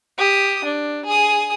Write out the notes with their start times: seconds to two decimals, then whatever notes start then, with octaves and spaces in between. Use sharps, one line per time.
0.18 G4 D#6
0.64 D4
1.05 G#4 D#6